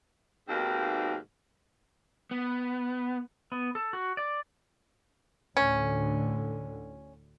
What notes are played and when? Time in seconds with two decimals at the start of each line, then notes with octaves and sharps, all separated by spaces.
0.48 D#2 G#2 B2 A#3 C4
2.31 B3
3.52 B3
3.75 A4
3.93 F#4
4.17 D5
5.57 D2 A2 D3 C#4